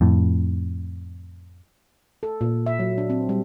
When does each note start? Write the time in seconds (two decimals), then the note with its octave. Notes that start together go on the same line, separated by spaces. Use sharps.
0.01 F2 A2
2.23 A4
2.41 A#2
2.66 E5
2.79 F#3
2.98 D4
3.10 C4
3.29 G3